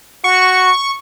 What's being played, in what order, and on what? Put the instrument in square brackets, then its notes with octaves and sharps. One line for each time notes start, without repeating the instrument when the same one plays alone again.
[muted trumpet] F#4 [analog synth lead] C#6